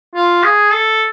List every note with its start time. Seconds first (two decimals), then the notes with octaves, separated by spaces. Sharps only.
0.15 F4
0.43 G#4
0.72 A4